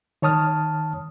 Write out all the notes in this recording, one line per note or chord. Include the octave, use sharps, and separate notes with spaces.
D#3 C#5 A5 D#6 F6